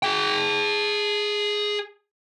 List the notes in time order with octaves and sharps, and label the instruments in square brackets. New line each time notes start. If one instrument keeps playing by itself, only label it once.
[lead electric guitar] G#4 G5